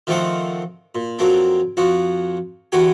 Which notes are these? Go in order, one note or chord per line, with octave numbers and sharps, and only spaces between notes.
D#3 F3 A3 C4 F5 F#5
A#2
F2 F#3 A#3 C4 D4
F2 F3 F#4
E2 D3 F#4 G4 G#5